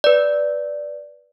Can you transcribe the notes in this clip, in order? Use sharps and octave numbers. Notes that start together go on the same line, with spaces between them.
B4 D5